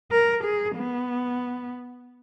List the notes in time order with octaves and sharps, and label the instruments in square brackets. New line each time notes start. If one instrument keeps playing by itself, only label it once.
[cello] A#4
G#4
B3